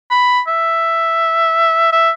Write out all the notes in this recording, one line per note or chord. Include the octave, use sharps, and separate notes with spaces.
B5
E5
E5